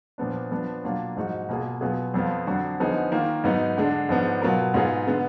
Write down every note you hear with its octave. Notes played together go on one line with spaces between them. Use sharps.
A#2 F3 B3 D4
F3 B3 D4
B2 F#3 A#3 D4 F4
G#2 F3 G#3 D#4 F#4
B2 A#3 F4 G#4
B2 F#3 B3 F4 G#4
F2 F3 B3 F4
F2 D3 F#3 D4 F#4
D3 F3 B3 D#4 G#4
D#3 A#3 F4
G#2 F#3 B3 D#4
D3 G#3 D4
G#2 F3 B3 D4
B2 F#3 B3 F4 A#4
G#2 F#3 B3 F4 G#4
D3 G#3 B3